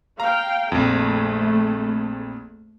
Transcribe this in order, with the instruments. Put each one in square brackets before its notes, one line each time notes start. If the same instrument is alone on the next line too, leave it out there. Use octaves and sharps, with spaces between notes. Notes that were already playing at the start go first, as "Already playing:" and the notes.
[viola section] F5 G5 [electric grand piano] A#5
[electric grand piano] A#1 F2 [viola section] A3